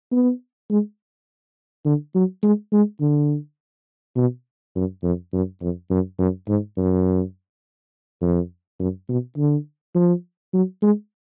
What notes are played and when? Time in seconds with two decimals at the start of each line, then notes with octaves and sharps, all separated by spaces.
0.12 B3
0.70 G#3
1.85 D3
2.14 F#3
2.43 G#3
2.72 G#3
3.01 D3
4.16 B2
4.75 F#2
5.03 F2
5.33 F#2
5.61 F2
5.90 F#2
6.19 F#2
6.48 G#2
6.77 F#2
8.21 F2
8.79 F#2
9.09 B2
9.37 D3
9.95 F3
10.53 F#3
10.82 G#3